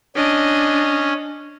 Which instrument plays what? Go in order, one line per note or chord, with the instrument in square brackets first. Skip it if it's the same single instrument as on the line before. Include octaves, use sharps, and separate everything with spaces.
[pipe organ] C#4 [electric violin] D4 D#5